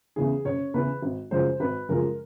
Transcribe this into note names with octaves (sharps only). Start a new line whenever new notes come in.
E2 C#3 E3 G#4
F#1 C#5
E2 C#3 E3 B4
G#1
F#2 C#3 F3 G#3 C5
G#1 B4
F#2 C#3 F3 G#3 A#4